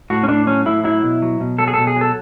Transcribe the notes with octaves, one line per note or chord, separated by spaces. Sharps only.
A2 F#4
C#4
A2 D4
F#3 C#4
A2 E4
F#3 E4
B2
F#3
B2
F#3 A4
G#4
B2 A4
G#4
F#3 A4